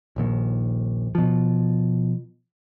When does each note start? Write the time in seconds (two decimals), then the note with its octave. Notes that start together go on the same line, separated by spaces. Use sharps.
0.16 D#1 A#1 D#2
1.15 B2 F3